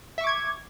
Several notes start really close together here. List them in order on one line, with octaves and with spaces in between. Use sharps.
E5 C#6 D6 G#6